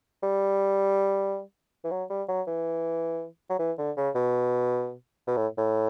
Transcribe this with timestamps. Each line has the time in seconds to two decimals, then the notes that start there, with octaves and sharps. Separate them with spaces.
0.23 G3
1.84 E3
1.91 F#3
2.10 G3
2.29 F#3
2.47 E3
3.50 F#3
3.59 E3
3.78 D3
3.97 C#3
4.15 B2
5.27 B2
5.37 A2
5.58 A2